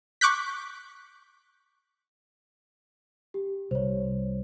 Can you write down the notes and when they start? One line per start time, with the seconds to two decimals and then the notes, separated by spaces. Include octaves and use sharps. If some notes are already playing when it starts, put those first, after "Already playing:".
0.21 C#6 D6 F#6 G6 B6
3.34 G4
3.71 C2 C5 C#5